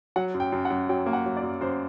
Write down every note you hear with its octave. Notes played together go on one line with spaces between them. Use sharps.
F#3 F#5
F#2
G5
F#2
F#5
F#2
F#3 G5
A#3
F#5
F#3
D5
F#2
F#2 C5